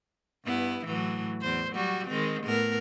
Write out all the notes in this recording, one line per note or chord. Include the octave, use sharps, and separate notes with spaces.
G2 B3 E4
A2 E3 F#3
E2 C5
F#3 G3 F#4
D#3 G#3 C4
A2 B3 A#4